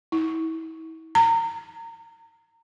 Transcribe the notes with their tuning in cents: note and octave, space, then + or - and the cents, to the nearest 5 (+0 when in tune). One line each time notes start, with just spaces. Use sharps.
E4 -35
A#5 -30